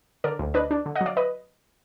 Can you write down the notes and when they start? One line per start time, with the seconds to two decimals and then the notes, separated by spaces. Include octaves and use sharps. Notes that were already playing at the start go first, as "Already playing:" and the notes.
0.24 D3 A#4 D5
0.39 D2
0.54 D4 B4 D#5
0.71 D4
0.86 D3
0.95 D#5 F#5
1.01 F#3
1.06 D5 F5
1.17 B4 D#5